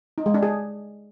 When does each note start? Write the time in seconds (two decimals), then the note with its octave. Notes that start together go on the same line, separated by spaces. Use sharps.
0.18 D#4
0.26 G#3
0.34 D4
0.43 G#4